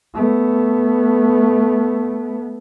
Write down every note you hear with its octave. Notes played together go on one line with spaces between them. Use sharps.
A3 B3